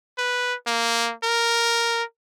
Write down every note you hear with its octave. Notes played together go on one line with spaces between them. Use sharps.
B4
A#3
A#4